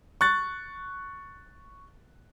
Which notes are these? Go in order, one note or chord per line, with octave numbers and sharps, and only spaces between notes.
C#6 F#6 A6